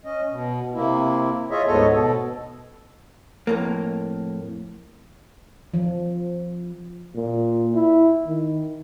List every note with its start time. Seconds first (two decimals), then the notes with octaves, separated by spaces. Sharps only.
0.05 C#4 D#5
0.30 B2
0.74 C3 A#3 E4
1.51 F4 G#4 C#5 D#5 E5
1.67 D2 G#2 B3 A4 C#5 D#5
1.92 B2 A4
3.47 F2 A2 A#3
5.74 F3
7.15 A#2
7.75 E4
8.26 D#3